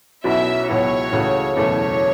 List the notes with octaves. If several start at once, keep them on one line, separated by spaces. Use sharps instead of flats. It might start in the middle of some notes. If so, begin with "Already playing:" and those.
B1 B2 F#3 C#4 E4 E5
C#2 B2 F#3 B3 E4 C#5
C#2 C#3 E3 A3 F#4
F#1 E2 B2 A3 C#4 C#5